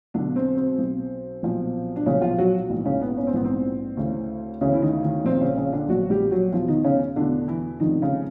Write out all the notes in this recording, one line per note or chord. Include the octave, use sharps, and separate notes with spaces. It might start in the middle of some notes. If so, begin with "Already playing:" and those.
B1 B2 D3 D4
C4
C4
B1 B2
B1 A#2 F3
D4
B1 A#2 C#3 F3 C#4
F3 F4
F#3 F#4
A#1 G#2 E3
C#3 C#4
B3
C#4
C4
A#1 G#2 E3 B3
C4
D2 C#3 E3
D2 C#3 E3 C#4
E4
D#3 D#4
D#3 D#4
A#1 A#2 F3 C4
C#3 C#4
C#3 C#4
D3 D4
A#1 A#2 F3 F#3 F#4
G3 G4
F#3 F#4
E2 B2 F3 F4
D#3 D#4
C#3 C#4
E2 B2 D3 D4
E3 E4
F1 F2 D3 D#3 F3 D#4
C#3 C#4